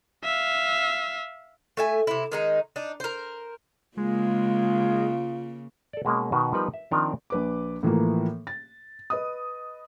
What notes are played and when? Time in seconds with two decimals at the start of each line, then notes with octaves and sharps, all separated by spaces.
0.24 E5 F5
1.77 A3 E5 G#5
2.07 C3 E4
2.32 D#3 G#3 D#4
2.76 D4 D#4
3.00 A#4 C5
3.97 C#3 G#3 A#3 F4
5.93 A4 D5
6.05 B2 G#3 A#3 C#4
6.32 B2 D#3 F#4 B4
6.53 F3 G3 B3 D#4 A#4 B4
6.74 E5
6.91 D#3 F3 C4 D4 A#4 D#5
7.30 A#1 B4 D6
7.83 A2 E3 F3 A#3
8.47 A6
9.10 B4 D#5 D#6